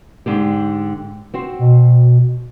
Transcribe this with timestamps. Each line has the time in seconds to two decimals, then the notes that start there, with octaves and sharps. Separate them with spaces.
0.26 G#2 D3 G4
1.34 C4 F#4 C5
1.59 B2